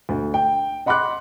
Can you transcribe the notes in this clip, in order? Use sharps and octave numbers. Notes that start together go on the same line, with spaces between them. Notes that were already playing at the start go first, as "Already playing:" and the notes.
D2
G5
D#5 F#5 B5 C6 D6 F#6